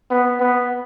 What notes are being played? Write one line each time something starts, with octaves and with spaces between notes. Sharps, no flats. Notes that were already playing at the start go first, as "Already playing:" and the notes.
B3
B3